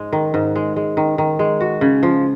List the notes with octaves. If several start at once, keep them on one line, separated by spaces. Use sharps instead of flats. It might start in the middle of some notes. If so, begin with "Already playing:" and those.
Already playing: G#2 G#3
D#3
G#2
G#3
G#3
D#3
D#3
G#3
F#4
C#3
F3